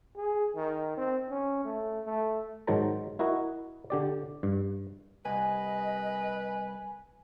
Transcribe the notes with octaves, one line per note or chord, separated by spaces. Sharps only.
G#4
D#3
C4
C#4
A3
A3
G#2 D#3 F#3 C5 A5 A#5
E4 F#4 A#4 D#5
D3 G4 D5
G2
C2 B4 D#5 G#5